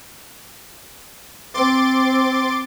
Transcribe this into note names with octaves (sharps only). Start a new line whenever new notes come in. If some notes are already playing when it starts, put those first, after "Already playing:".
C4 C6 D6 A6